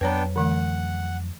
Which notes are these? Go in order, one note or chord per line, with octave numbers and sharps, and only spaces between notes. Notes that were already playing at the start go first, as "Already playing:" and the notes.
F2 F#3 B3 D4 B4 C#5 G5 A#5
D3 E3 A3 F#5